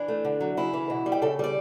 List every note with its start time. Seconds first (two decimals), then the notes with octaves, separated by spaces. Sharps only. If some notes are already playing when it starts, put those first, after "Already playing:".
Already playing: E3 D4
0.08 A3
0.25 D3
0.41 F#3
0.57 C#3 E4
0.74 E3
0.90 B2
1.06 G3
1.12 G4
1.22 C#3 A4
1.39 G3 D5